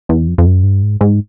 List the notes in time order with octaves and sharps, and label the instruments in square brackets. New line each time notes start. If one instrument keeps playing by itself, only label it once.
[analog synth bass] E2
F2
F2
F#2
G2
G#2
G#2